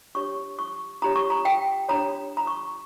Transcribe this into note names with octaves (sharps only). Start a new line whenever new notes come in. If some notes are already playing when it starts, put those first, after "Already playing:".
D4 G4 C#5 C#6
C#6
D4 G4 C#5 A#5
C#6
A#5
G5
D4 G4 C#5 A#5
A#5
C#6